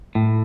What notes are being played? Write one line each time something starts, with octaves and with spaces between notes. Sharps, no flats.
A2